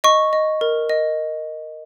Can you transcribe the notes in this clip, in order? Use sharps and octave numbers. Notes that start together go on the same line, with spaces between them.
D#5 C#6
D#5
A#4
D#5